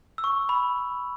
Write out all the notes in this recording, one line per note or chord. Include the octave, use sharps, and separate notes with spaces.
E6
C#6
B5